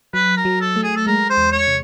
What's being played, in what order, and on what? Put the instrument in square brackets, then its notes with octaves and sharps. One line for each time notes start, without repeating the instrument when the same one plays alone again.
[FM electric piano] F#3 [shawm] B4
[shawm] A#4
[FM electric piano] F#3
[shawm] A4
[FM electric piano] A3
[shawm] G#4
A4
[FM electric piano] G#3 [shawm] A#4
[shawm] C5
[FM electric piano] E2
[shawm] C#5
[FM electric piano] C3